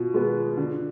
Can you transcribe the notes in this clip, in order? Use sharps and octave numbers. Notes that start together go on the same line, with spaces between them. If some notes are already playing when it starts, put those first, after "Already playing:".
Already playing: B2 F4
G#3 B3
D3